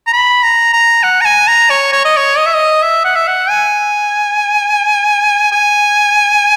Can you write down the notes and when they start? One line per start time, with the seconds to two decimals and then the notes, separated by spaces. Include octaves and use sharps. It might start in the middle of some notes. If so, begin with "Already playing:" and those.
0.07 A#5
0.13 B5
0.43 A#5
0.73 A#5
1.03 F#5
1.21 A#5
1.25 G#5
1.48 A#5
1.70 C#5
1.93 C#5
2.05 D#5
2.17 C#5
2.37 D#5
2.46 E5
2.55 D#5
2.82 E5
3.05 F#5
3.16 E5
3.28 F#5
3.50 G#5
5.52 G#5